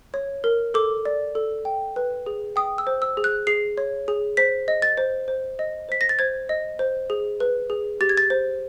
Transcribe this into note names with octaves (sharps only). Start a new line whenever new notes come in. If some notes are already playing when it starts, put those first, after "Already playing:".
C#5
A#4
A4 D6
D5
A4
G5
B4
G#4
G5 D#6
E6
C5
E6
G#4
F#6
G#4 C7
C#5
G#4
C5 B6
D#5
A6
C5
C5
D#5
C5 B6
A#6
A6
C5 G#6
D#5
C5
G#4
B4
G#4
G4 A6
G#6
A6
C5